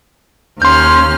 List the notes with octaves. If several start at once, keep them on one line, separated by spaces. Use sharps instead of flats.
D#2 C#4 C6 F6 G6